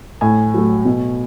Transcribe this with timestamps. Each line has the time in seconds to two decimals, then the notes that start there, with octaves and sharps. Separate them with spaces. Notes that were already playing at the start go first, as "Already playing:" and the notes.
0.21 A2 G#5
0.54 F#3 A3
0.85 B2